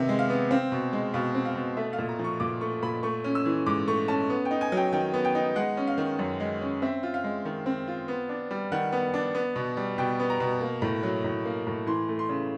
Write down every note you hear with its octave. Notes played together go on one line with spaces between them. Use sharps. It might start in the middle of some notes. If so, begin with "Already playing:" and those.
Already playing: C3 D#3 B3 E5
G#3
F5
B3
C4 F5
B2
G#3
B2 F5
C4
F5
B2
A3 E5
F5
A#2
A#5
F3
C#6
A#2 D6
A3 C#6
A#2 B5
A3 C#6
C#4
E6
E3
G#2 D6
A3 C#6
C#4 A5
B3
G5
D#4
G#5
F#3
G5
D#3 G5
B3
G5
D#4
G#3 F#5
C#4
F5
D#3
F#2
G#3
C#4
C4 E5
F4
F5
G#3
D#3
C4
F4
B3
D4
G3
D#3 F#5
B3
D4
B3
B2
G3
B2 G5
B3
A#5
B2
A#3
A2
F#3
A2
A#3
A2
E3 C6
A3
C6
C#3